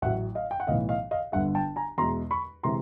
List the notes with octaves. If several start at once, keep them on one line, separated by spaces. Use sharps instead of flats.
A1 A2 F#3 E5 F#5
D#5 F5
G5
F#5
B1 A2 E3 D#5 F5
D#5 F5
D#5 F5
G1 G2 D3 E5 F#5
G5 A5
G#5 A#5
E2 B2 G#3 A#5 C6
B5 C#6
C3 E3 G#3 A#5 C6